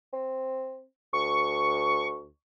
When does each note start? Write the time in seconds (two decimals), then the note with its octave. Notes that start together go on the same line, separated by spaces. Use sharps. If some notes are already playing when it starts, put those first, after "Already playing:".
0.13 C4
1.13 D2 C#6